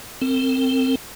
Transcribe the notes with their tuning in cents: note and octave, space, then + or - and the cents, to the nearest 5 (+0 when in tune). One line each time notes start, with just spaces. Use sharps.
C4 +0 A#4 -40